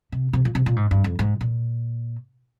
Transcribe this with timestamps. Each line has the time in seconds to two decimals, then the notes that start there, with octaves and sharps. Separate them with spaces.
0.12 C3
0.33 C3
0.45 A#2
0.55 C3
0.66 A#2
0.76 G#2
0.91 G2
1.04 F2
1.19 G#2
1.41 A#2